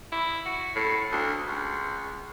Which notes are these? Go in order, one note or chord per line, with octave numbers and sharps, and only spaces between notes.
E4
F#4
A2
D2
C#2